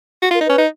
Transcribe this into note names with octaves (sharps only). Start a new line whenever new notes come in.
F#4
F4 A#4
D#4
C#4 B4
D#4